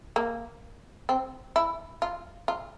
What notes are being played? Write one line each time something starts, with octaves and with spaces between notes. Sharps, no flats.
A#3
C4
E4
F4
F4